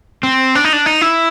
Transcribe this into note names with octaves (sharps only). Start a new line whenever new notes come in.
C4
D4
D#4
D4
D#4
E4